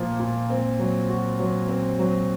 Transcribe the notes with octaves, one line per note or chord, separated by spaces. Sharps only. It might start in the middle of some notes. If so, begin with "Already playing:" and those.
Already playing: A#2 F3 A#3 F4
A#2
C4
F#3
F#4
F#3
C4
F#3